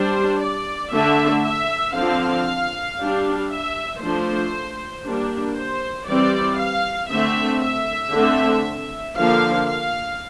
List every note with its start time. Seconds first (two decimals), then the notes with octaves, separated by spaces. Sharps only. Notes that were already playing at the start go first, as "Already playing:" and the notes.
Already playing: G3 D4 C5
0.41 D5
0.93 D3 A3 D4 E5
1.44 E5
1.95 D3 F3 C4 F5
2.99 G3 D4
3.50 E5
4.02 F3 A3 D4 C5
5.04 G3 A#3 D4
5.56 C5
6.07 E3 G3 C4 D5
6.59 F5
7.10 D3 A3 C4 E5
7.62 E5
8.13 D3 A3 C4
9.16 D3 F3 A#3 F5
9.68 F5